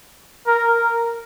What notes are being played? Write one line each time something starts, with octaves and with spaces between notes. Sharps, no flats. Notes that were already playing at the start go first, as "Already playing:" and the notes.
A#4